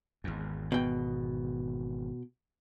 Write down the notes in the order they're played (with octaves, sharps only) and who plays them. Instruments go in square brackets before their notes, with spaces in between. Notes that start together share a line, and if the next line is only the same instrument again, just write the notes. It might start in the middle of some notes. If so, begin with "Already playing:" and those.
[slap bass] G#1 E2
[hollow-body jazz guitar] B2 G5